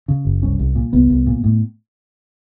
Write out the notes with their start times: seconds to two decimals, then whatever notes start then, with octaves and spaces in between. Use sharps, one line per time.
0.08 C#3
0.25 F#1
0.42 C2 C#4
0.59 C2
0.75 A#2
0.93 C2 B3
1.10 C2
1.26 A#2
1.44 A2